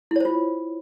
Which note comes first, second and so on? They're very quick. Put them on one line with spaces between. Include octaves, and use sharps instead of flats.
E4 C#5 C5 F4